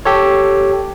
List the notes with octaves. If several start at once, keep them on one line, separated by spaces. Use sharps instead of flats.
G4 A4 C#5